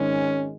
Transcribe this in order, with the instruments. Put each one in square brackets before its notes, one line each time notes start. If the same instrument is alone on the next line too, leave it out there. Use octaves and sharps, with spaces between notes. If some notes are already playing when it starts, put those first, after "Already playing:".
Already playing: [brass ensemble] G#1 G#2 D#3 G#3 C#4